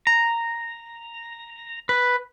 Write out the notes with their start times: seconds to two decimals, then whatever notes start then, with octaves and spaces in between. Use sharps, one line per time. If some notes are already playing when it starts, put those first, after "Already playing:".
0.07 A#5
1.89 B4